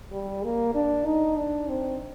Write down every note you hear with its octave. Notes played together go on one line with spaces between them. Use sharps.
G3
A#3
D4
D#4
D4
C4